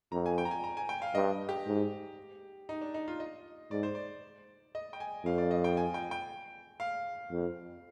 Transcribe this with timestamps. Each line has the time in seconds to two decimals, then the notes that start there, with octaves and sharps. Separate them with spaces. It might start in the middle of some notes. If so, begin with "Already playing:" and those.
0.12 F2 A#5
0.26 G#5
0.38 G5
0.45 A#5
0.51 G#5
0.64 A#5
0.77 G#5
0.89 G5
1.02 F5
1.15 G2 D#5
1.49 G4
1.67 G#2
2.69 D#4
2.82 D4
2.94 D#4
3.08 F4
3.20 D#5
3.71 G#2 D5
3.83 C5
3.95 D5
4.75 D#5
4.93 G5
5.00 G#5
5.25 F2 F5
5.38 D5
5.51 D#5
5.64 G5
5.77 G#5
5.94 G5
6.11 G5
6.80 F5
7.31 F2